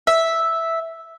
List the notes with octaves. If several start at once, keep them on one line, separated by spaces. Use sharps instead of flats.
E5